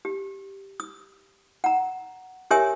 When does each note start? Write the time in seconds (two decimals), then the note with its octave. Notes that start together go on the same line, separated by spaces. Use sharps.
0.05 G4
0.80 D#6
1.64 F#5 A#5
2.51 G4 A#4 C#5 E5 G#5 D#6